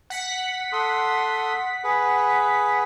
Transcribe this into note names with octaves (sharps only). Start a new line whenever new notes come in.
F#5 B6
A4 C6 D#6
G#4 B4